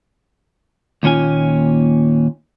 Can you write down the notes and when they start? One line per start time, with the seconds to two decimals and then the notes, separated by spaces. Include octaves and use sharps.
1.03 D#2 A#2 C#4 F4 G#5